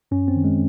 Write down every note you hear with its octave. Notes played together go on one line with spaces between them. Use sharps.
F#2 C#4
C4
D#3
G#3